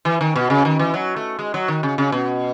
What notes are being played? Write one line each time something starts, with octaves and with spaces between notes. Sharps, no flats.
E3
D#3
B2
C#3
D#3
E3
F#3
A3
G#3
F#3
D#3
C#3
C#3
B2